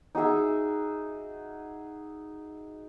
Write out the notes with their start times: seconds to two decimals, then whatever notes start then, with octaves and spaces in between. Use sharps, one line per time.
0.15 D#4 F#4 G#4 E5